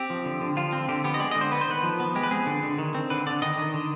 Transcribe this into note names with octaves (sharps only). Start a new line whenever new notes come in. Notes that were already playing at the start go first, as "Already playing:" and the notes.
Already playing: C4 G4
F3
D3
D3
F3 F4
C4
D3 G4
B3 G4
D#5
G#3 D5
D3 D#5
C5
B3 B4
C5
D#3 B4
F3
B3
G#3 G4
B4
C4 G#4
D3
D3
D#3
C4
D3 B4
D3 D5
D#3 D#5
D#3
D3